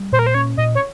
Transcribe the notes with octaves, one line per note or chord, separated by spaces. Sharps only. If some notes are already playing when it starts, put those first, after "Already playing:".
Already playing: G3
A#2 C5
A#4
C5
C#4 C#5
A#2 D#5
C#5